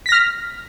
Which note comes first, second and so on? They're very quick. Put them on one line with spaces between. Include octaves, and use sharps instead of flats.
B6 A#6 F6